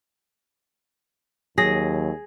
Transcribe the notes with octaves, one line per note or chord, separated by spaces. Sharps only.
D#2 F#3 G#4 A#6